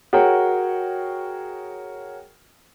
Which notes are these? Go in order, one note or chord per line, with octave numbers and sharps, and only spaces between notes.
F#4 G#4 A#4 C#5 G5